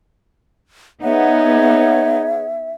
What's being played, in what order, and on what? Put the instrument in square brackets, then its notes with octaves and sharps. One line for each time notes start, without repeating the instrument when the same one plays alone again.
[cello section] B3 [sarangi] D#4 [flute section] G#4 C#5 F#5 [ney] E5